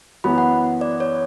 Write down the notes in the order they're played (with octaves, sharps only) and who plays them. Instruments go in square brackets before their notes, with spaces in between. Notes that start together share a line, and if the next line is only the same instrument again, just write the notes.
[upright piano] F#2 E3 B3 F#4 [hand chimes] B5
[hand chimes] F#5
D5
C#5